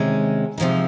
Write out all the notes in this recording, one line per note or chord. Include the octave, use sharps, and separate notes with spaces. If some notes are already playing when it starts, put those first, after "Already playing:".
Already playing: C3 D#3 G#3 C#4
C3 F3 G#3 D#4